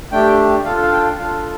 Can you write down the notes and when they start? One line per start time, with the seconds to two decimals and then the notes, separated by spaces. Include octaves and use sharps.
0.12 A3 D4 G4 G5
0.65 D4 F4 A4 F5
0.82 F5
0.92 G5
1.19 D4 F4 A4 F5